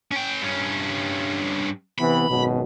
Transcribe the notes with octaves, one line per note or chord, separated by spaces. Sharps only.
C#4 G5
G2 C#4
C3 E3 B3 B5
G#1 F#2 B2